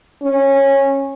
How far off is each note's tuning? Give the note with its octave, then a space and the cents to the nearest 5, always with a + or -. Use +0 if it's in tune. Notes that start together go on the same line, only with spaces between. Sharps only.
C#4 -15